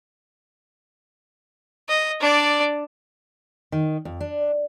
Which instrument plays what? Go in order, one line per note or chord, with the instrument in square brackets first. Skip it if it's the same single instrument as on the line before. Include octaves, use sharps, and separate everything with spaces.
[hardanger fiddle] D#5
D4 D5
[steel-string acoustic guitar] D#3
F2
D4